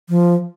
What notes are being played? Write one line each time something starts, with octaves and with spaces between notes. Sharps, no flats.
F3